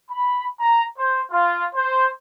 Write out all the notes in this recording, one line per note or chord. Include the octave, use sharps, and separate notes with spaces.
B5
A#5
C5
F4
C5